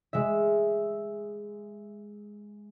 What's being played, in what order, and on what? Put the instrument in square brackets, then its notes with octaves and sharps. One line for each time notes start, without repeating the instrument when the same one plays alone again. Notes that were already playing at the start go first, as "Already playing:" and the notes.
[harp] G#3 E5